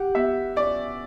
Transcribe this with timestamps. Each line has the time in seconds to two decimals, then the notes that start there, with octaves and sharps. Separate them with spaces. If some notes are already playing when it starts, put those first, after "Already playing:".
Already playing: G4 F#5
0.15 B3 E5
0.56 C#4 D5